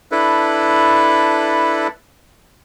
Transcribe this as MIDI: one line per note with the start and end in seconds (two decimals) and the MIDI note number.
0.12 1.87 62
0.12 1.87 64
0.12 1.87 69
0.12 1.87 71